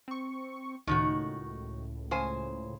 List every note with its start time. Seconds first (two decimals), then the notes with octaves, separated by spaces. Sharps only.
0.08 C4 C#6
0.87 C#2 A2 D#3 D#4 F#4
2.11 C#3 C5 G#5